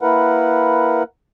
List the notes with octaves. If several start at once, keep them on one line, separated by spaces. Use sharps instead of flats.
A#3 E4 A#4 B4 F#5